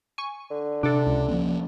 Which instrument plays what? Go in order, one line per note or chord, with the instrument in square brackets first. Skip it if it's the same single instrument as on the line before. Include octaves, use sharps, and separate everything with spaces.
[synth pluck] G#5 C#6
[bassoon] D3
[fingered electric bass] C3 [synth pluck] D4 A4
[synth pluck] C#2
[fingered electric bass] F3 A#3 C#4